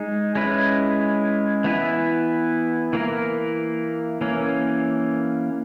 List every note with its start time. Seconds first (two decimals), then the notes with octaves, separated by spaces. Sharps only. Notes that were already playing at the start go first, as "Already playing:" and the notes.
Already playing: G#3 D#4 G#4
0.35 G#3 C#4 E4 B4
1.64 E3 B3 E4 B4
2.93 E3 A#3 E4 A#4
4.21 E3 A#3 C#4